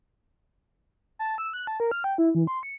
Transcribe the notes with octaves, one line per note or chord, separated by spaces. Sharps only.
A5
E6
F#6
A5
A#4
F6
G5
E4
E3
C6
C#7